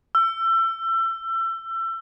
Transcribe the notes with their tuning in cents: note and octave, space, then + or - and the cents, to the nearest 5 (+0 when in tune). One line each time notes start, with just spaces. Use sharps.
E6 +30